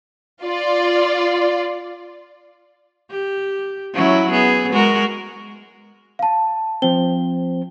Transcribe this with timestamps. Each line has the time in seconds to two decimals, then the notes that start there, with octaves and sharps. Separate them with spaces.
0.43 F4 D5
3.11 G4
3.94 F#3 C#4 E4
4.31 B3 G#4
4.72 G#3 F#4 A#4
6.19 F5 A5
6.82 F3 C4 G7